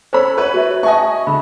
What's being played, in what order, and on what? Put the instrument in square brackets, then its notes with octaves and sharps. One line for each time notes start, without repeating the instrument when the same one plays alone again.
[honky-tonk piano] C#4 A4 B5 [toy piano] C5
[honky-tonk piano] B4 C#5
[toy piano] F#4 E5
[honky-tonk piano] D#5 G#5 C#6 [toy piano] E5 A5
[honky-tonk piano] D3 [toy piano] B5